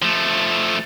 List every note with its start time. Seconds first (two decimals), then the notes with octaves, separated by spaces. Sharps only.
0.02 F3 A3